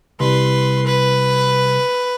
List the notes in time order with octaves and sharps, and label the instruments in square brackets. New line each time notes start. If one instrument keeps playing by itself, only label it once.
[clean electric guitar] C2 [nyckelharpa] B4 C6
[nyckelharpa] B4